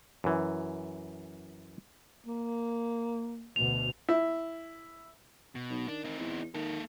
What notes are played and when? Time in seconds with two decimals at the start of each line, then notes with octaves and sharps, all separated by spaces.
0.24 F#2 E3
2.27 A#3
3.56 D2 B2 F7
4.09 E4
5.55 B2
5.70 B1
5.88 D#3 D4
6.04 C4 D#4
6.20 E2
6.55 D#3 A#3 A4